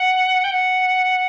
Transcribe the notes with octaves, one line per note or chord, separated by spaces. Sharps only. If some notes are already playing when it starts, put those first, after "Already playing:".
Already playing: F#5
G5
F#5